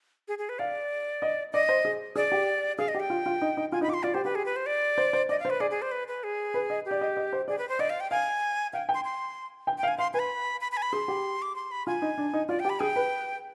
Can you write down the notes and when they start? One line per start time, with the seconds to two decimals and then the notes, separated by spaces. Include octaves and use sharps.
0.28 G#4
0.38 G#4
0.49 B4
0.59 D5 F5
1.22 D#5
1.53 D5 D#5
1.69 C5
1.85 G#4
2.16 G#4 D5
2.32 G4
2.78 G#4 F5
2.88 D#5
2.95 G4
3.00 G5
3.10 F4
3.26 F4
3.41 D#4
3.57 D#4
3.72 F4 G#5
3.81 D#4 B5
3.88 F4 D6
3.94 C6
4.03 F4 D5
4.14 G4 C5
4.25 G4 B4
4.35 G#4
4.46 B4
4.56 C5
4.66 D5
4.98 C5
5.13 C5
5.29 D5 D#5
5.40 F5
5.45 C5
5.50 B4
5.60 G#4 D5
5.71 G#4
5.82 C5
5.91 B4
6.08 B4
6.24 G#4
6.54 B4
6.70 D#5
6.85 G4
6.91 D5
7.01 D#5
7.17 D#5
7.33 C5
7.48 G#4 D5
7.58 B4
7.69 C5
7.79 D5 D#5
7.90 F5
8.00 G5
8.11 F5 G#5
8.73 F5 G5
8.89 G5
8.94 C6
9.05 C6
9.67 G5
9.78 G5
9.83 F5
9.88 G#5
9.98 F5 C6
10.14 B4 G#5
10.19 B5
10.61 B5
10.72 B5
10.77 G#5
10.82 B5
10.93 G#4 C6
11.08 G4
11.42 D6
11.56 C6
11.71 B5
11.87 F4 G#5
12.02 D#4
12.18 D4
12.33 D#4
12.48 F4 D5
12.60 G5
12.65 G4
12.70 B5
12.80 G#4 G5
12.96 B4